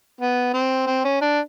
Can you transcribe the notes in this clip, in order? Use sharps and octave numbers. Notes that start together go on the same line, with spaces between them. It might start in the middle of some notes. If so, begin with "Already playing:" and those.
B3
C4
C4
C#4
D4